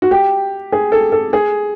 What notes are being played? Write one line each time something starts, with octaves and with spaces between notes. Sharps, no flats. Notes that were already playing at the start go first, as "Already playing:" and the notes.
F#4
G4
G#4
A4
A4
G#4